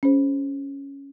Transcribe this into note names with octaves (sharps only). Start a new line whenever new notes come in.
C#4 G#4 C5